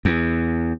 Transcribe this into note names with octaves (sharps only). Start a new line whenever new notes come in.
E2